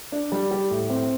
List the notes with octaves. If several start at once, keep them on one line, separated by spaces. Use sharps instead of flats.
D4
G3
G4
A2
C4